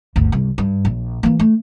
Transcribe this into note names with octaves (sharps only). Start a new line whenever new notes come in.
G1 D2
C2
G2
A#1
E3 A#3
A3